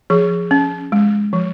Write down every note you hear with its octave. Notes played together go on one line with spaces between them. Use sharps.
F3 G#4
C#4
G#3
F3